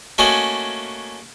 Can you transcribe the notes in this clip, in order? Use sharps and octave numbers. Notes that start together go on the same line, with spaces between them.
A3 A#3 C#4 F#4 D#5 G#5